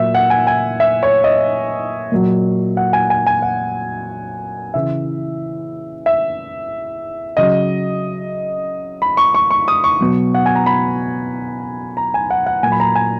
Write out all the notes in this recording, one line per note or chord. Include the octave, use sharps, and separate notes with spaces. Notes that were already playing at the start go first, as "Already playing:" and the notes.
Already playing: A#2 F#3 E5
F#5
G#5
G#5
E5
C#5
D#5
A#2 F#3
F#5
G#5
G#5
G#5
F#5
C#3 E3 E5
E5
C#3 F#3 D#5
B5
C#6
C#6
C#6
D#6
C#6
B2 F#3
F#5
G#5
A#5
B5
A#5
G#5
F#5
F#5
A#2 F#3 G#5
B5
A#5
G#5